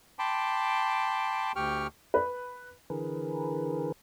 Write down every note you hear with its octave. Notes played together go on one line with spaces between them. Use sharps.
G5 A5 B5 C6 D6
D2 G4 G5 C#6 F6
B4
D3 E3 G#4 A#4 B4